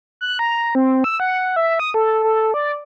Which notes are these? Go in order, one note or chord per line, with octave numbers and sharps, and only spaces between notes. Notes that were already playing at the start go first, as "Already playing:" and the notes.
F#6
A#5
C4
E6
F#5
E5
D#6
A4
A4
D5